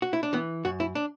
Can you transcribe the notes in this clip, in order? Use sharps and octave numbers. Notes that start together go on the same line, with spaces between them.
F#4
E4
D4
E3 B3
F#2 F#4
E4
D4